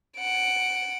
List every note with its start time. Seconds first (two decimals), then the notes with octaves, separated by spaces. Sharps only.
0.18 F#5 D7